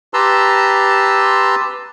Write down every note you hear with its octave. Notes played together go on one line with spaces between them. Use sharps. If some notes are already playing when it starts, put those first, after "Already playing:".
G4 B4 A5 A#5 C6 E6